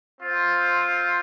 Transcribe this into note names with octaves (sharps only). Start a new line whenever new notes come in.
C4 F4 C5